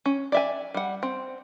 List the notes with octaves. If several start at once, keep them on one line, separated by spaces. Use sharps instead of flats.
C#4
D5 E5 G#5
G3 F#5
C4